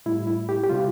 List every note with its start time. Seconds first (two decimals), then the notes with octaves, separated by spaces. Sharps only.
0.06 A2 G3 E4
0.27 E4
0.49 G4
0.64 G4
0.69 C3 G3 F4